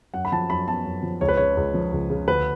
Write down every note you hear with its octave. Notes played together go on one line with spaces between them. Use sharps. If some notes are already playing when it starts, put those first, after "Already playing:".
F#2 F#5
B5
F3 A5
F#2 B5
B3 A5
F#2
F3
C#2 C#5
B4
C#3 C#5
C#2
F3
C#2
C#3
D2 B4